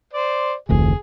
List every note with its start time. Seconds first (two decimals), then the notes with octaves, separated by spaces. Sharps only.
0.14 C5 D5
0.69 F1 D2 E3 G#4